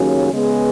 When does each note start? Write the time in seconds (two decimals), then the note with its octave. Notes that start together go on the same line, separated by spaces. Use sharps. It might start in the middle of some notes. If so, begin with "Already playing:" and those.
Already playing: D#2 C#3 F#3 C#4
0.32 C#3 G#3 B3 G#4